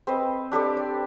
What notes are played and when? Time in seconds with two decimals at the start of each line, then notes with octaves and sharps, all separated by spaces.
0.07 C4 B4 C5 D#5
0.52 D4 G4 A4 D5
0.77 D5